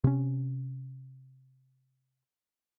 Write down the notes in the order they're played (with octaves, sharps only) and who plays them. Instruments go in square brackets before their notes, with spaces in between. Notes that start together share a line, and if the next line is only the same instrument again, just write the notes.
[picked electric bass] C3 C#4